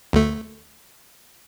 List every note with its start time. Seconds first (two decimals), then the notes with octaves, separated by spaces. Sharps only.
0.13 D2 A3